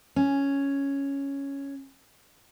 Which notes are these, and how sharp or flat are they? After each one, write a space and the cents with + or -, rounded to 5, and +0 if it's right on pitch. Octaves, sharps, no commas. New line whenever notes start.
C#4 +0